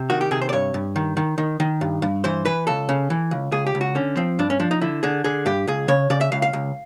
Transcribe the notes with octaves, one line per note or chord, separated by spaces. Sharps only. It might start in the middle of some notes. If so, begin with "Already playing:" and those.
Already playing: C3
D#3 F#4
G4
C3 G#4
C5
D5
G2 C#5
G2
D#3
D#3
D#3
D#3
G2
G2
E3 C5
E3 B4
C#2 A4
C#3
E3
C#2
C#2 G#4
G4
C#2
F#4
D3 C#4
F3 C4
G2 D4
C#4
F3 D4
D#4
D3 E4
D3 G#4
D3 G#4
G2 G4
C#2 G#4
C#3 C#5
C#3 D5
E5
C#2 F5
F5
C#2